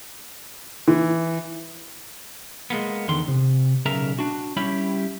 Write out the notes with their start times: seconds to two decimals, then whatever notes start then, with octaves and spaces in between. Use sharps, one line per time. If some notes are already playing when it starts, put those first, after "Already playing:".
0.88 E3
2.70 G#3 A#3 B3
3.08 E2 D3 D#3 C6
3.28 C3
3.86 B1 C#3 A#4 E5 A#5
4.19 D4 F#4
4.57 G3 C#4 E4 G4 B5